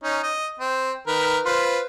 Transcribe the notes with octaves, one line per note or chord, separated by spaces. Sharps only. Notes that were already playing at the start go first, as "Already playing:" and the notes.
C#4 D#4
D#5
C4
D#3 A#4 B4
F4 B4 C5